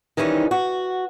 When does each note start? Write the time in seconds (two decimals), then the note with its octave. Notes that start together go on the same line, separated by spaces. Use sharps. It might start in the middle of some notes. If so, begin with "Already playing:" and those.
0.17 D#3 E3 G3 C#4 D#4
0.51 F#4